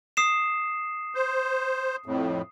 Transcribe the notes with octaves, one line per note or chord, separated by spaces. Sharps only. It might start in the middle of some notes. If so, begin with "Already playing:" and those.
D#6 C7 E7
C5
F2 A2